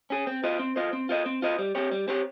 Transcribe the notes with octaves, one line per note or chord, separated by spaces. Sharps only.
C#4 G#4
C4
F4 C5 D#5
C4
F4 C5 D#5
C4
F4 C5 D#5
C4
F4 C5 D#5
G3
C4 G4 C#5
G3
C4 G4 C#5